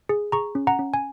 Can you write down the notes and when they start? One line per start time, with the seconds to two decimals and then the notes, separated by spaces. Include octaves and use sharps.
0.09 G#4
0.32 G#4 A#5 C#6
0.55 C#4
0.67 F#5 A#5
0.79 C#4
0.94 G#5